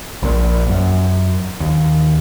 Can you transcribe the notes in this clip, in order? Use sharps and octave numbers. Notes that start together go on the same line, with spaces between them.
A#1 A#2
F#2
D#2